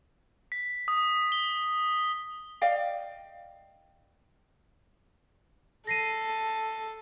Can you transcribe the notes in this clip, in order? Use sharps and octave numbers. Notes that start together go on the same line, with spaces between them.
B6
D#6
G7
D5 D#5 F5 G5
A4 A#6 C7 D#7